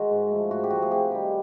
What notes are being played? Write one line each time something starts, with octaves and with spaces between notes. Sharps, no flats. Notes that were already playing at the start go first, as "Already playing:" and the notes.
Already playing: D#3 G#3 F#4
G#2
F3 A3
G#2 F#4
G4
F3 A3 F#4
G#4
C3 G4
D#3 G3